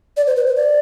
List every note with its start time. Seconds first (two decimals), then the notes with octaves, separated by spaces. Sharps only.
0.17 D5
0.27 C5
0.36 B4
0.47 C5
0.57 D5